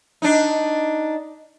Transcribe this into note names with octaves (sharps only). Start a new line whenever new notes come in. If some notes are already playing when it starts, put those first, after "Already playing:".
D4 D#4